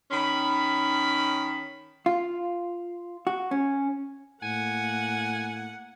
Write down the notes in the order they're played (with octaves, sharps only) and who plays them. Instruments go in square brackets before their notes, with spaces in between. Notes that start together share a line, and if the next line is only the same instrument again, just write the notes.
[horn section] D#3 C#4 B5
[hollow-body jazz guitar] F4
F#4
C#4
[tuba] A2 [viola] A#3 F#5 [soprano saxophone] G#5